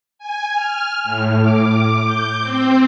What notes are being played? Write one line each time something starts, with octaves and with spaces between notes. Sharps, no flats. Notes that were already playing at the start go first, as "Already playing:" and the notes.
G#5
F6
A2
D6
G6
C4